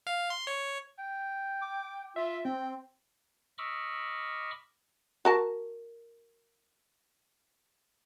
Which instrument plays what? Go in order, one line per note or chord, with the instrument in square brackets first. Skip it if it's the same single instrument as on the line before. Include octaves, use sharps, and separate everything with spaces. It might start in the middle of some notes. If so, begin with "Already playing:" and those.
[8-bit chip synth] F5
C6
C#5
[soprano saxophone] G5
[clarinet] D6
[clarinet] F4 [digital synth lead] E5
[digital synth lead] C4 [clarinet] G5
[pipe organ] D#5 B5 C#6 D6 E6 F6
[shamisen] F#4 A#4 A5